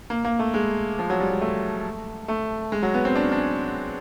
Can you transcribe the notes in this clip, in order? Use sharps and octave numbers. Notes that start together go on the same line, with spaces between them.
A#3
A#3
A3
G#3
F3
F#3
G3
G#3
A3
A3
G#3
F#3
B3
C4
D4
C#4
D4